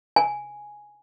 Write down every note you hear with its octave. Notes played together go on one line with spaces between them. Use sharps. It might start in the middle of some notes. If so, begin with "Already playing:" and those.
G#5